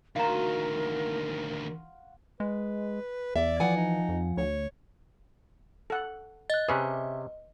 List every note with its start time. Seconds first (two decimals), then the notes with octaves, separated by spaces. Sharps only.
0.16 D2 D#3 F4 F#4 A#4 F5 A#5
2.40 G#3 B4
3.36 E2 D5 E5
3.60 E3 F3 F#5 G#5
3.76 D#4
4.09 F2
4.37 D2 C#5
5.90 A4 F#5
6.50 D#5 F#6 A6
6.68 C3 C#4 G#4 B4 E5